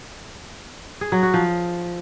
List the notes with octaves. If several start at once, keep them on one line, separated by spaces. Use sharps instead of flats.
G#4
F#3
F#4
F3